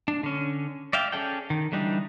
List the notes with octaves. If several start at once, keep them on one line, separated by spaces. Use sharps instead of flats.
D4
D3 C#4
D5 E5 F5 G5
C#4 G#4 A4 D5 G5
D#3
D3 E3 G3 D4 D#4